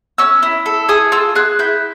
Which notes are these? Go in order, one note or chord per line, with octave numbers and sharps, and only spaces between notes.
C#4 E6
E4
A4
G#4 D#6
F4 E6
G#4 F#6
E4 G6